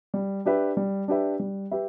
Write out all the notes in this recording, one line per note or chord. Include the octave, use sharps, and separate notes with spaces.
G3
D4 G4 B4 E5
G3
D4 G4 B4 E5
G3
G4 B4 E5